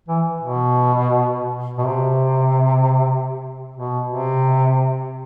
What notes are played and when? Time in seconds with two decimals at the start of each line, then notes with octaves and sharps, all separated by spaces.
0.08 E3
0.41 B2
1.78 B2
1.85 C3
3.76 B2
4.08 C3